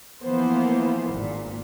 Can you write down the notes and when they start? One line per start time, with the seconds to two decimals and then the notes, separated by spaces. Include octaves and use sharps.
0.24 E3 F3 A#3 B3 C5
1.10 G#1 A#2